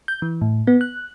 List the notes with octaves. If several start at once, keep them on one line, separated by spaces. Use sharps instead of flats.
G6
E3
A2
B3
F#6